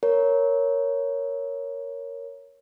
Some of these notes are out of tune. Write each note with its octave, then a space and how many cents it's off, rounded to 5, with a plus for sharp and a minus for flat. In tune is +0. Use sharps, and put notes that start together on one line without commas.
A#4 +0 C#5 +0